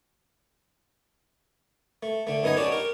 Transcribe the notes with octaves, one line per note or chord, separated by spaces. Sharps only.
A3
D3 A3
F#2 B3 D#4 D#5 G#5
C#4 D4 F#4 G4 D5
G4 A#4